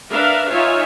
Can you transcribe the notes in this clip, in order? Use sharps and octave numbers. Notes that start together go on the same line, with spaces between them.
D4 A#4 B4 E5 F5
D#4 F4 C#5 E5 F5 G#5